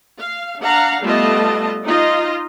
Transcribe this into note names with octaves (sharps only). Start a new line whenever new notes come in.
F5
D4 F5 F#5 A#5
G3 A3 B3 F4 D#5 A5
D#4 F4 D#5